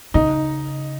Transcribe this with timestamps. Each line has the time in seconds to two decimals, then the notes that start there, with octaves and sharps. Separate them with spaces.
0.14 C#3 D#4